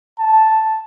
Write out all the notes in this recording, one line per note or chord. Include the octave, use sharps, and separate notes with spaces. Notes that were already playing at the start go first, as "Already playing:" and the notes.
A5